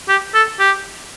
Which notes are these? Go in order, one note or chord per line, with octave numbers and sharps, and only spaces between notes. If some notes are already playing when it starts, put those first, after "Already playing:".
G4
A4
G4